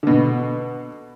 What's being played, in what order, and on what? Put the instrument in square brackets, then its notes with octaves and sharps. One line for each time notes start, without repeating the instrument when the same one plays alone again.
[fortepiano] B2 D3